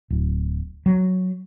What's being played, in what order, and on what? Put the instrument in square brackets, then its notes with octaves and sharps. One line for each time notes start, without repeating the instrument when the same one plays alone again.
[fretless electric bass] D1
F#3